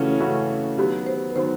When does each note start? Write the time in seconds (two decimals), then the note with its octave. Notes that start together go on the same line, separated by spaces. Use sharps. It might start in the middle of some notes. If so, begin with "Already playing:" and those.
Already playing: C#3 E3 A3 C#4 F4 F#4
0.20 C#3 E3 A3 C#4 F#4
0.78 D#3 F#3 B3 G4
1.06 C5
1.30 B4
1.36 D#3 F#3 B3 C5